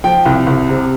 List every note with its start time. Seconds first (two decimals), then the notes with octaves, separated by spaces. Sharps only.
0.04 F3 G5
0.25 C2
0.47 C2
0.69 C3